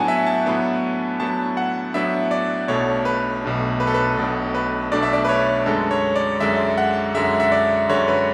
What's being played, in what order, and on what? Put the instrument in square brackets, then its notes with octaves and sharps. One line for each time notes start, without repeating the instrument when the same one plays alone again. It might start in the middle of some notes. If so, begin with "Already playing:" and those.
Already playing: [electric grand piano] A2 F#3 B3 D4 F#5 G#5 A5
E5
A5
A2 F#3 B3 D4
A2 F#3 B3 D4 A5
F#5
A2 F#3 B3 D4 E5
D5
B1 B2 A3 D4 C#5
B4
B1 B2 A3 D4
B4
A4
B4
B1 B2 A3 D4
B4
B1 B2 A3 D4 D5
E5
D5
B4
C#5
F#2 D3 G#3 A4
C#5
D5
F#2 D3 G#3 E5
F#5
F#2 D3 G#3 E5
E5
D5
F#2 D3 G#3 C#5
B4